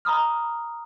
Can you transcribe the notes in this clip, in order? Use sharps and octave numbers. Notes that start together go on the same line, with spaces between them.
A#5 B5 D#6 F6